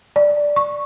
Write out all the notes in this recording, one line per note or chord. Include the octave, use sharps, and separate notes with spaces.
D5
C#6